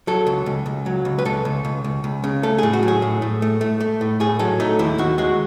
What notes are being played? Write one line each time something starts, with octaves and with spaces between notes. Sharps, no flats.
F#3 A4
C#2
C#2
C#2
F#3
C#2
B4
C#2 A4
C#2
C#2
C#2
C#2
C#3
A3 A4
A2 G#4
F#4
F#3
G#4
A2
A2
A3
A3
A3
A2
A2 G#4
F#3 A4
A3 D#4
D#2 E4
D#2 F#4
G#3 F#4